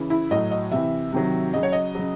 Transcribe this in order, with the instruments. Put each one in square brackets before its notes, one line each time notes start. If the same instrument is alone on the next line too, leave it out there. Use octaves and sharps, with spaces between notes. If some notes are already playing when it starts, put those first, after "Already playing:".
Already playing: [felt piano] C#3 E3
E4
A2 F#3 D#5
D#5
C3 E3 E5
C3 D#3 F#3
C#3 F#3 D#5
C#5
D#5
C#3 F#3